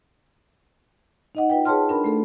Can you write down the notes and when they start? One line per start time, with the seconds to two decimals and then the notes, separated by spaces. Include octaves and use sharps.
1.35 D#4 D#5 F#5
1.50 F4 B4 G5
1.65 G#4 B4 C#5 A5 C6 F6
1.89 D4 A#4 B5
2.04 A3 A4